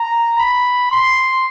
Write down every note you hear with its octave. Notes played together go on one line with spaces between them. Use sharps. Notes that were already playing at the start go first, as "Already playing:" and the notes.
Already playing: A#5
B5
C6